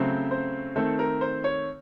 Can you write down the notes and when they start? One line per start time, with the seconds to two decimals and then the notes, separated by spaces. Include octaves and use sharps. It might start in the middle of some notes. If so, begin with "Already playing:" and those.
Already playing: C#3 F#3 A3 C4 C5
0.31 C5
0.76 D#3 A3 C4 A4
0.99 A#4
1.21 C5
1.44 C#5